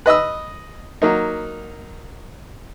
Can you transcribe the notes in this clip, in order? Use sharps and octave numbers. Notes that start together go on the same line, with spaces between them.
B4 D#5 D#6 E6
F#3 A#3 D#4